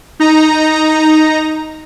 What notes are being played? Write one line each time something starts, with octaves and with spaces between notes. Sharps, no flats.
D#4 A#5